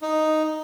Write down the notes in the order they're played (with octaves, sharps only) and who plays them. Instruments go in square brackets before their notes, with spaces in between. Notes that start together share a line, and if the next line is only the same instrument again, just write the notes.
[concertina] D#4